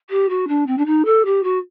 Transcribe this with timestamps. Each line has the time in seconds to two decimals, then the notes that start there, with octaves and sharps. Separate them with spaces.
0.10 G4
0.29 F#4
0.48 D4
0.67 C4
0.78 D4
0.86 D#4
1.05 A4
1.25 G4
1.43 F#4